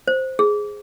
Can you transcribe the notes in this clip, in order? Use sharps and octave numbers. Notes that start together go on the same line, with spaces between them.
C5
G#4